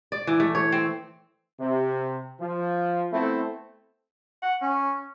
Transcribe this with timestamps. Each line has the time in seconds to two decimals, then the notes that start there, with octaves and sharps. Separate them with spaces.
0.12 D5
0.27 E3
0.40 A3
0.55 C#5
0.72 C4
1.59 C3
2.41 F3
3.12 A3 B3 C4 E4
4.42 F#5
4.62 C#4